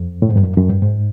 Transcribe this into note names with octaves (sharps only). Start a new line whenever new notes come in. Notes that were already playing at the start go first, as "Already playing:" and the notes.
Already playing: F2
A2
G#2
G2
F#2
F#2
G2
G#2